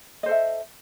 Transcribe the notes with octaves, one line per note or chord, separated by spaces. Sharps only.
A4 C5 D#5 E5